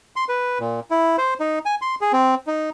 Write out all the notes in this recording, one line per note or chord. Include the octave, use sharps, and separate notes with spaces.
C6
B4
A#2
E4
C5
D#4
G#5
C6
G#4
C4
D#4